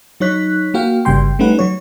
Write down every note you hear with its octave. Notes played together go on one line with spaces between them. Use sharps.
F#3 D#4 C#5 F#6 B6
A#3 F#4 F5 G5
G1 C#3 G3 G5 C6
G3 A3 C#4 D#4 B4 F#5
F#3 C#5